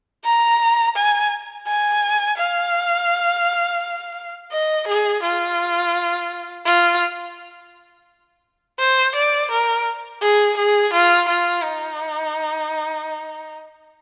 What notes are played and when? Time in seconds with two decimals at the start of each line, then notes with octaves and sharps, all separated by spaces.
0.25 A#5
0.96 G#5
1.67 G#5
2.38 F5
4.52 D#5
4.88 G#4
5.23 F4
6.66 F4
8.79 C5
9.15 D5
9.51 A#4
10.22 G#4
10.57 G#4
10.93 F4
11.28 F4
11.64 D#4